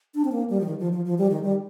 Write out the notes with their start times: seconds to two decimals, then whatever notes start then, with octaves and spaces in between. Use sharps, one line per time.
0.15 D4
0.25 C4
0.32 A#3
0.50 G3
0.61 F3
0.66 D#3
0.79 F3
0.92 F3
1.05 F3
1.18 G3
1.30 D#3
1.43 G3